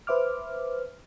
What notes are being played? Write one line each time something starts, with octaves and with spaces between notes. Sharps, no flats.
B4 C5 E5 D6 F6